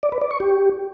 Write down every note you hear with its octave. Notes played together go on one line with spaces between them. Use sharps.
D5
B4
D5
C#6
G4